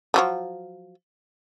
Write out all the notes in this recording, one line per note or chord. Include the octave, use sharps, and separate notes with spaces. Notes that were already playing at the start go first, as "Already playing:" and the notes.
F3 F#3 A3